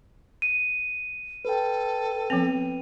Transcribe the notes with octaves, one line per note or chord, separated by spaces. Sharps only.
D#7
A4 B4 G5
F3 B3 C4 F7